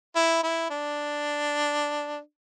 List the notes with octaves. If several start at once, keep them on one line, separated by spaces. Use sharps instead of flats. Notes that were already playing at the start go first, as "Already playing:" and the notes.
E4
E4
D4